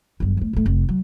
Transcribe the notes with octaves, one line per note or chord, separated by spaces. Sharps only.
G1 F#2
E2 A3
A2 A3
F1
F#3